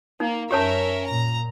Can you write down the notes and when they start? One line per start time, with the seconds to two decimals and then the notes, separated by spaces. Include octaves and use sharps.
0.20 A#3 D#4
0.51 F#2 C#4 G4 A#4 C#5 E5 A5
1.05 A#2 A#5